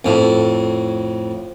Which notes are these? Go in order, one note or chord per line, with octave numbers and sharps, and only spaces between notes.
F2 A2